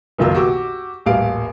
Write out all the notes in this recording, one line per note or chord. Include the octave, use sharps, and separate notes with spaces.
F#1 B1 D#3 F4 E6
F#4 G4 D6 E6
D#1 A1 G3 F5 D7